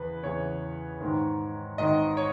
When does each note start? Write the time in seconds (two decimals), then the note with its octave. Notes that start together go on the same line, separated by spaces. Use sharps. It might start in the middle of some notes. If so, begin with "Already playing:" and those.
Already playing: E2 C#3 E3 B4
0.23 E2 C#3 E3 C#5
1.01 G#2 D#3
1.78 G#2 D#3 D#5
2.17 C#5